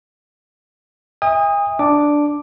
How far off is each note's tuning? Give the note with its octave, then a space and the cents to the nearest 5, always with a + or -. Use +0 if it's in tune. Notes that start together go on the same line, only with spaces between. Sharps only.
E5 -35 G#5 -45 D#6 +0
D4 +0 D6 +0